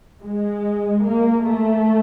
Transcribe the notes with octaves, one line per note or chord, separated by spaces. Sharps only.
G#3
A#3
A3